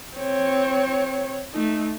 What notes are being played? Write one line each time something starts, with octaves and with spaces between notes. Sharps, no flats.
C4 C#5
A3 D#4